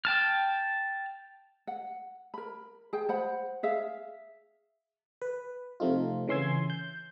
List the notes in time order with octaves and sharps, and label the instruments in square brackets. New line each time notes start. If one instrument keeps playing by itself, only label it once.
[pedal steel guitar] G5 A5 F6
[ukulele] F#5
A#4 B5
G#4 G5
C5 F#5 B5
G#4 E5 F5
[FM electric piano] B4
C3 F3 A3 C4 D#4 F4
C#3 E3 C#4 C6 E6 G#6
G6